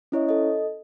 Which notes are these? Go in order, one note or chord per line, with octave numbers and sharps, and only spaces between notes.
C#4 E4 C#5 D#5
A4 D#5